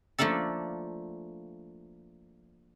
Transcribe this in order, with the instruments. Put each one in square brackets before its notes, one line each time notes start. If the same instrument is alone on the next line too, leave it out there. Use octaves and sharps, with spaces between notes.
[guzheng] F3 A3 A#3 D4 A4